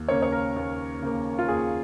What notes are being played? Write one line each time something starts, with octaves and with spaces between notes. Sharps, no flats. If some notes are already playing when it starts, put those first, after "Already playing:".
Already playing: D#2
C#3 A#3 C#5
C#5
A#4
D#2
C#3 A#3
F4
D#2 G#4